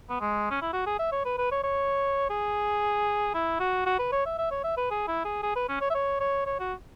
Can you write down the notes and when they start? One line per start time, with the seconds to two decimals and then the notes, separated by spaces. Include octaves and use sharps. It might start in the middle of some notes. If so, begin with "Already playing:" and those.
0.09 B3
0.20 G#3
0.51 C#4
0.62 E4
0.73 F#4
0.86 G#4
0.99 E5
1.12 C#5
1.25 B4
1.38 B4
1.51 C#5
1.64 C#5
2.30 G#4
3.34 E4
3.60 F#4
3.86 F#4
3.99 B4
4.12 C#5
4.25 E5
4.38 E5
4.51 C#5
4.64 E5
4.77 B4
4.91 G#4
5.08 E4
5.25 G#4
5.43 G#4
5.56 B4
5.69 C#4
5.81 C#5
5.90 E5
5.95 C#5
6.20 C#5
6.46 C#5
6.60 F#4